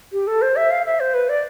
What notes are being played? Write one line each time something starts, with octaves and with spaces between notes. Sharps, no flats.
G4
A4
C5
E5
F5
E5
C5
B4
D5